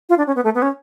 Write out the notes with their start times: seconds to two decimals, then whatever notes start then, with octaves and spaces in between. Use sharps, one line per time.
0.09 F4
0.18 D4
0.27 C#4
0.36 B3
0.44 A3
0.55 B3
0.62 C#4